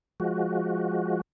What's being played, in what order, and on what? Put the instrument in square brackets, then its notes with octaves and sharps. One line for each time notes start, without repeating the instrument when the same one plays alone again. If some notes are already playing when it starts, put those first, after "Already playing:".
[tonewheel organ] F3 G#3 F#4